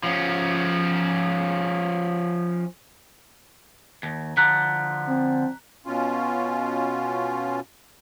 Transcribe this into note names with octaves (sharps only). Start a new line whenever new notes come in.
F3 C#4
D#2
D3 F3 A#5 F#6 B6
C4
B2 C#4 F4